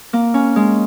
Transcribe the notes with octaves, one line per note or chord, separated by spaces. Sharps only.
A#3
C#4
G#3